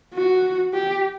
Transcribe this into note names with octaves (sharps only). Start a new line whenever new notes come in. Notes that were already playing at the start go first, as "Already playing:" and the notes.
F#4
G4